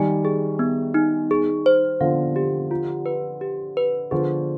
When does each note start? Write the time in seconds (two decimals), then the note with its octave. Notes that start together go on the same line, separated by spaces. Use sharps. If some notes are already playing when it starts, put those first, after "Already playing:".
Already playing: D#3 G3 G#5
0.25 G#4
0.59 B3
0.94 D#4
1.31 G#4
1.66 C5
2.01 D3 F3 F5
2.36 G4
2.71 F4
3.06 B4
3.41 G4
3.77 B4
4.11 D3 F3 G#4